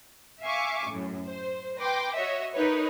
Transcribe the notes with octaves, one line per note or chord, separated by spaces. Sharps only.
E5 F5 G#5 C#6 D6
F#2 A2
C5
B4 G5 C6 D6 A#6
F#4 C#5 D#5 E5
D#4 A#4 B4 C#5